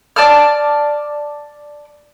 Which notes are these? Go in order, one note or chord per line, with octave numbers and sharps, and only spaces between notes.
D5 A5 F6